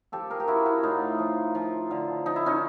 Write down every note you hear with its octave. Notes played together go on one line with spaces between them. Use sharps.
F3 G4 A4
G#4 A#4
G4
F3 E4 F#4
E4 F#4
A2 D#4 F4
F3
F3
D3
F3 D#4
E4
C#4 D#4